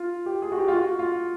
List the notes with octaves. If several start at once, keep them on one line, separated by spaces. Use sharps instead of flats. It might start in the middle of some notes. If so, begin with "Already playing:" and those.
Already playing: F4
G4
G#4
F#4
G4
F4
F#4
F4